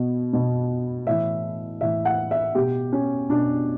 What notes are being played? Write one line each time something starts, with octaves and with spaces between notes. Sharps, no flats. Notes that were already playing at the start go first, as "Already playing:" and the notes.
Already playing: B2
B2
A2 E3 E5
A2 E3 E5
F#5
E5
B2 G4
C#4
B2 D4